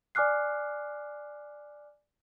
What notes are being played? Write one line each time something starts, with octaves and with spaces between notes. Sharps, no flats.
D5 G#5 D6 F6 F#6 C7